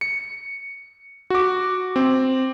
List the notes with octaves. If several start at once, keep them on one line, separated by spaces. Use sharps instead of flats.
C#7
F#4 D6
C4